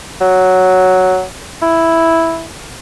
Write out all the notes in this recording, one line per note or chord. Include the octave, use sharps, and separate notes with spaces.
F#3
E4